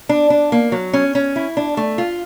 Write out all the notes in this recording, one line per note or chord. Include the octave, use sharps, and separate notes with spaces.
D4
D4
A#3
F#3
C#4
C#4
E4
D4
A3
F4